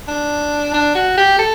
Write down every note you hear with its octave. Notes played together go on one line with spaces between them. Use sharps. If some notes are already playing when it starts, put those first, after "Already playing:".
D4
D4
F#4
G4
A4